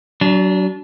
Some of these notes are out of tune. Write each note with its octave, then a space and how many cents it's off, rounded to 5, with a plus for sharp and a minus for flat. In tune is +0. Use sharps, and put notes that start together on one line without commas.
F#3 +25 D4 -25